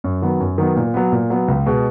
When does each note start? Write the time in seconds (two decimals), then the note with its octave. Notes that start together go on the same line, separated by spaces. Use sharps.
0.04 F#2
0.22 D#3 F#3 B3
0.40 F#2
0.58 D#3 F#3 B3
0.76 A#2
0.94 F#3 B3
1.12 A#2
1.30 F#3 B3
1.48 C#2
1.66 B2 G#3